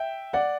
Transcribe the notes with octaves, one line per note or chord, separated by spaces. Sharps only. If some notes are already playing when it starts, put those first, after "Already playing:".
Already playing: E5 G5
D5 F#5